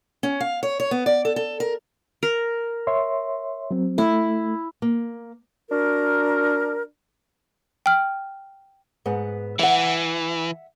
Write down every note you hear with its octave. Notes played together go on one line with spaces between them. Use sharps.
C#4
F5
C#5
C#5
B3
D5
A4
A4
A#4
A#4
C#5 E5 C6
F#3 C4
A3 E4
A#3
D4 F#4 A#4
G5 F6
G#2 B3
E3 E5 F#5